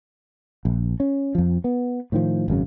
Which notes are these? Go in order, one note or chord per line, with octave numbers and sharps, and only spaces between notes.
A#1
C#4
F2 F3
B3
A2 D#3 F3
G#1 F#2 C#3